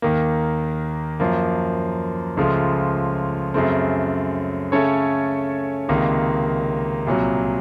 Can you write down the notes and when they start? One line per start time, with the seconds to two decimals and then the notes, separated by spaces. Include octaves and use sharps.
0.02 D#2 D#3 A#3
1.20 F#2 F3 A#3
2.37 C#2 C#3 F3 A3
3.54 F#2 C#3 A3 C4
4.72 C#3 A3 C#4 A4 C#5
5.89 C#2 C3 D#3 A#3
7.07 C2 A#2 F#3